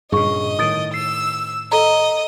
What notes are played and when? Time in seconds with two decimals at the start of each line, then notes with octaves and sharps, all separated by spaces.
0.12 G2 A#2 C#3 G#4 D#5 C#6
0.59 A2 D#3 D#6 A6 D7
0.94 E6 C7
1.72 A4 D#5 A#5